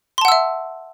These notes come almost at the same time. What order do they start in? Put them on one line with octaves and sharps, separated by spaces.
C6 A5 F#5 E6 E5